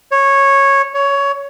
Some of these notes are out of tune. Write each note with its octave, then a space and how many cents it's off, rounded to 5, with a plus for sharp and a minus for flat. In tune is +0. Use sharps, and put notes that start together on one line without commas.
C#5 -10
C#5 +15